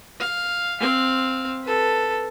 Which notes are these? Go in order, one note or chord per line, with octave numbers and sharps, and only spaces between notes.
F5
C4 F5
A4 B4